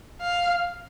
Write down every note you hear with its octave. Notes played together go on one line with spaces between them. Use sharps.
F5